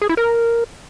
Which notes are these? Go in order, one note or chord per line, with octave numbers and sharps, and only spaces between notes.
G#4
E4
A#4